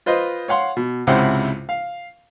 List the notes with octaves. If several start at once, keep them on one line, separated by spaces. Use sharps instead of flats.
F4 B4 C5 D#5
C#5 F5 F#5 C6
B2
C#2 G#2 C3 E4 C5 F#5
F5